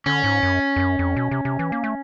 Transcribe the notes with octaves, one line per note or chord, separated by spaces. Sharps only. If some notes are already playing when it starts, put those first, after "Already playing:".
D3 C#4
G#2
F#2
F2
F#2
F2
B2
C3
C3
E3
A#3
A3